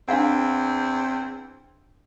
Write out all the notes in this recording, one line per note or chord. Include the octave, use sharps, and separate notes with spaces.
E2 C4 D4 F5 F#5